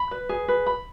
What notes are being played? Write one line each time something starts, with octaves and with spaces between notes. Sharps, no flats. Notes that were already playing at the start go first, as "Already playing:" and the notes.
Already playing: B5
B4
G#4
B4
B5